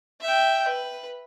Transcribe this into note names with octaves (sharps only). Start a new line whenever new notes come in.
E5 G5
B4